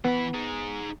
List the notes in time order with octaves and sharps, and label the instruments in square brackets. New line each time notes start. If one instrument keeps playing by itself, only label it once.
[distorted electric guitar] E3 B5 [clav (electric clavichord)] B3
[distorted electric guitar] D#4 G#4